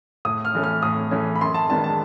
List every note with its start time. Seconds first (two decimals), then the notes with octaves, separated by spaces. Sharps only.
0.25 A2 D#6
0.45 F6
0.55 E3 A3 C#4
0.63 F6
0.82 A2 D#6
1.11 E3 A3 C#4
1.35 B5
1.41 F#2 C6
1.54 A5
1.69 D#3 G#3 B3 D4 A5
1.84 A5